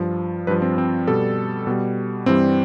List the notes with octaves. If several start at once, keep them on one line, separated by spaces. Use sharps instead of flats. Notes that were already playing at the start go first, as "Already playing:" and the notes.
Already playing: G2 F3
G2 F3 B4
C4
C4
B2 G3 A4
B2 G3
G2 E3 G3 C4